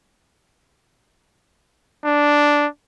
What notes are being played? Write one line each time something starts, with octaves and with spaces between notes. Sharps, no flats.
D4